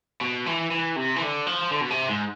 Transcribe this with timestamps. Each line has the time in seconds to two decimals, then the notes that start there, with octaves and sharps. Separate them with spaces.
0.21 B2
0.46 E3
0.71 E3
0.96 C3
1.16 E3
1.21 D3
1.47 F3
1.71 D3
1.81 B2
1.90 C3
2.09 G#2